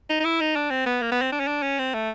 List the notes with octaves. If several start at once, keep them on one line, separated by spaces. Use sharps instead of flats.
D#4
D#4
E4
D#4
D4
C4
B3
A#3
B3
C4
D4
C#4
D4
C#4
C4
A3